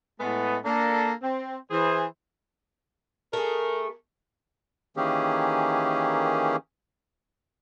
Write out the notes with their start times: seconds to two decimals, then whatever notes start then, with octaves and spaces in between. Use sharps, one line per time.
0.20 A2 G#3 A3 B3
0.64 A#3 D4 A4
1.22 C4
1.71 E3 G#4 C5
3.33 A3 G#4 A#4
4.97 D#3 E3 A#3 C#4 G4 G#4